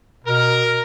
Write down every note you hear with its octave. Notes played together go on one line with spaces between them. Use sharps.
B2 A#4